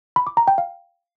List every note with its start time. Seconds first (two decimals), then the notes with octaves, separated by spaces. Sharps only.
0.16 B5
0.27 D6
0.37 A#5
0.48 G5
0.58 F5